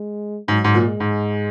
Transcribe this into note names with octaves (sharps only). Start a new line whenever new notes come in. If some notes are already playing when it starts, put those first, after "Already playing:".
Already playing: G#3
G#2 F#3
G#2
A#2
G#3
G#2